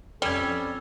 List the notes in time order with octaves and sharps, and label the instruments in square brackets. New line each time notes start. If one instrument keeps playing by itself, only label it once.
[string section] F2 [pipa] G3 [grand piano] C#4 G#6 [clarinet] A4